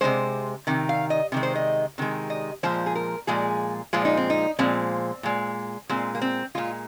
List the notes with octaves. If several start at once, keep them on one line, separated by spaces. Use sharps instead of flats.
C3 D#3 G#3 C5
C3 D#3
F5
D#5
C3 D#3 G#3
C5
D#5
C3 D#3 G#3
D#5
A#2 F3 G#3 C5
G#4
A#4
A#2 F3 G#3 G#4
A#2 F3 G#3 F4
D#4
C4
D#4
A#2 F3 G#3 C4
A#2 G#3
A#2 G#3 C4
A#3
C4
A#2 G#3 F4